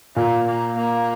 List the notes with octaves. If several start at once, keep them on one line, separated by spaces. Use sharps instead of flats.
A#2 A#3
A#3
A#3